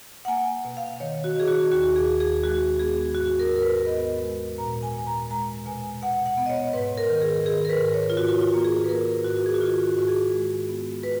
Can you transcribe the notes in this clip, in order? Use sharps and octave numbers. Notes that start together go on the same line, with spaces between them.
F#5
A#3 G#5
B2
F5
D#3 C#5
F#4
D#3 G#4
F#4
D#2 F#4
G#4
D#2
G#4
G#3 F#4
B3 G#4
G#2 F#4
A#4
G#2
A#4
B4
B3 D#5
G#3
A#2 A#5
G#5
A#2
A#5
G#3 A#5
B2 G#5
B2 F#5
F#5
B3
D#5
C#5
G#2 B4
A#4
D#3
G#4
D#3 G#4
A#4
B4
G#2
C#5
F4
G#2 F#4
F4
A#3
G#4
B4
A#3 A#4
G#2 F#4
G#4
F#4
D#3 F4
F#4
G#2 F#4
G#4
G#3
B3
B4